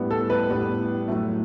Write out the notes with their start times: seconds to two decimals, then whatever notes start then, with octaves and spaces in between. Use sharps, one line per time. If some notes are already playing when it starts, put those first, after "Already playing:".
Already playing: A2 G3 B3 D4
0.11 A4
0.30 B4
0.49 A2 G3 B3 D4
1.08 A2 F#3 A3